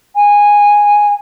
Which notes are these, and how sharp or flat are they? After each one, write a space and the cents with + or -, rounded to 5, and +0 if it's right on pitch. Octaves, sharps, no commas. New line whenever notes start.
G#5 -10